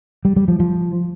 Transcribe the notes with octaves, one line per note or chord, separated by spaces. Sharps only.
G3
G3
F3
F3